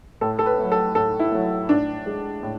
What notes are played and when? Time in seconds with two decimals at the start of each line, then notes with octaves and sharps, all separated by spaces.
0.21 A2 A4
0.39 A4
0.46 B4
0.59 F#3 A3
0.72 A4
0.95 A2 A4
1.20 E4
1.32 F#3 A3
1.69 A2 D4
2.06 G#3
2.43 A2